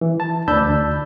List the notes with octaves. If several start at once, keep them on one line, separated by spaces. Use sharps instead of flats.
E3
A5
D2 D4 A5 B5 E6 G6